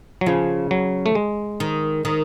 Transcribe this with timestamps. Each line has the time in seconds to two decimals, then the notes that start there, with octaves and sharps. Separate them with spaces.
0.21 F#3
0.26 C#3 F3
0.71 F#3
1.06 A3
1.15 G#3
1.60 D#3
2.05 D#3